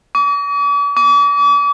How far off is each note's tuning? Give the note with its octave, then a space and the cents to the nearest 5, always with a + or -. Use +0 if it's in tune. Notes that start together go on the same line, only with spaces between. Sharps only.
D6 -45
D6 -40